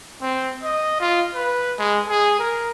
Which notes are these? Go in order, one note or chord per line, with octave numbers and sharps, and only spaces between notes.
C4
D#5
F4
B4
G#3
G#4
A#4